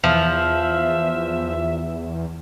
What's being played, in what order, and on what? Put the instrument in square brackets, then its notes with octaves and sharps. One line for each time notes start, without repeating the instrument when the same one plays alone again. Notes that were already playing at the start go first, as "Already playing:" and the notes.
[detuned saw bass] E2 [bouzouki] F3 [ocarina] E5